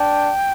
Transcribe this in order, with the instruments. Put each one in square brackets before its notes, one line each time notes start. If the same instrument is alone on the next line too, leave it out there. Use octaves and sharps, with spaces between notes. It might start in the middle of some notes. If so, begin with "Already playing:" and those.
Already playing: [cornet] D4 [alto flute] G5